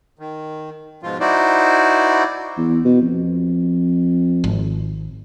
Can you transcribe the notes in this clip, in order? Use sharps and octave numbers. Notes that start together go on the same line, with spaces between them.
D#3
G#2 B2 F3 F4
D#4 E4 F#4 C5 D5
E2
B2
F2
G#1